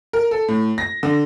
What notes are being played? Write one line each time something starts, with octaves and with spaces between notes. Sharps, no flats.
A#4
A4
A2
A#6
D3